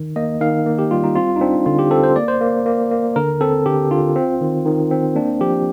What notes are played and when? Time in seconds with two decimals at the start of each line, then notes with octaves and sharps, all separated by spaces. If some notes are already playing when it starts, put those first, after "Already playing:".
Already playing: D#3
0.16 A#3 D#5
0.41 D#3 F5
0.66 A#3
0.78 G4
0.91 G3 F4
1.04 D#4
1.16 C4 F4
1.36 D#4
1.41 C4 D4
1.66 D3 F4
1.79 G4
1.91 C4 A4
2.03 C5
2.16 A#3 D5
2.28 C5
2.41 A#3
2.66 A#3
2.91 A#3
3.16 D3 A#4
3.41 C4 A4
3.66 D3 G4
3.91 D3 F4
4.16 C4
4.41 D#3
4.66 D#3
4.91 C4
5.16 A#3 D4
5.41 F3 G4